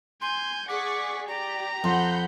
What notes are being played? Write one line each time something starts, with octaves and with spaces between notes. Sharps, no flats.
G#5 C6 G6
G#4 D5 F#5 C#6 D6 B6
G4 D5 A#5
F2 F#5 B5 C6 G6